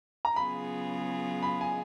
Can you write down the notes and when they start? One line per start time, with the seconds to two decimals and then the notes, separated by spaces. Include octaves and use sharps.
0.25 A#5
0.36 C#3 F#3 B3 F4 G#4 B5
1.43 B5
1.61 G#5